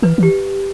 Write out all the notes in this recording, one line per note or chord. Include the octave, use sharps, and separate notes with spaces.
E3 B4
E3 G4